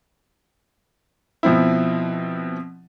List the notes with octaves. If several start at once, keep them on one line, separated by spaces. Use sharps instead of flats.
B2 F3 C4 E4